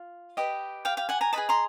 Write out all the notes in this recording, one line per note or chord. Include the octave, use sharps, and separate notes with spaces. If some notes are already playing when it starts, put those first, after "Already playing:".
Already playing: F4
G4 B4 D#5
F5 G5
F5 G5
F#5 G#5
G#5 A#5
G#4 B4 D#5 A5 B5
A#5 C6